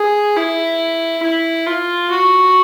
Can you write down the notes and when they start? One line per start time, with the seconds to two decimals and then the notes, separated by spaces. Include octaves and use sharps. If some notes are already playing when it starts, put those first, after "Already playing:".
Already playing: G#4
0.36 E4
1.23 E4
1.66 F4
2.10 F#4